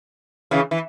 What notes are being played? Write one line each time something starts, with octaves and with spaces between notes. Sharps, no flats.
C#3 E3
E3